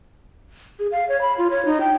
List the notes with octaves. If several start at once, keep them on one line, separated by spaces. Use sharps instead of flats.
G#4
F5
C#5
B5
F4
C#5
D#4
G5